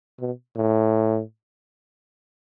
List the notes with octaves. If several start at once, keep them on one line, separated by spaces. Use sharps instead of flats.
B2
A2